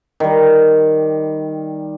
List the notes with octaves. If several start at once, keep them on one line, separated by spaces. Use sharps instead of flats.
D#3 G3